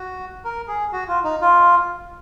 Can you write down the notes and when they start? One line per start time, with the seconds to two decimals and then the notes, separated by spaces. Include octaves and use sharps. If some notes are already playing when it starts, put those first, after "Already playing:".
Already playing: F#4
0.44 A#4
0.68 G#4
0.93 F#4
1.08 F4
1.24 D#4
1.41 F4